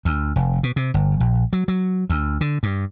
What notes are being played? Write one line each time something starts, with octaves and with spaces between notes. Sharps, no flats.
D2
F1
B2
C3
G1
A#1
F#3
F#3
D2
D3
G2